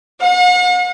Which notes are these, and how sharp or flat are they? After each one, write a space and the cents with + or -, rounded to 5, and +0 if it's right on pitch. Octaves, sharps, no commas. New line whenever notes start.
F#5 -40